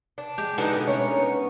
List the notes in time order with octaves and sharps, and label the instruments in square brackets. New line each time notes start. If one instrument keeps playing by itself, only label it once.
[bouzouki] D4
[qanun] G#3 [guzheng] G4
[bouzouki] D3 E3 F#5 [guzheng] D4 D#4 [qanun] D#5
[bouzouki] B2
[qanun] A3 C#4 A#4 [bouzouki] C#5
[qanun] B3